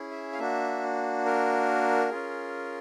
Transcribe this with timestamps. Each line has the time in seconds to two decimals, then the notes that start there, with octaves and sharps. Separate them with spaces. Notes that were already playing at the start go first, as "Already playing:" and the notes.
Already playing: C#4 E4 G#4
0.11 E5
0.32 F5
0.39 A#3 D4 F#4 E5
1.25 A#4
2.10 C#4 F4 G#4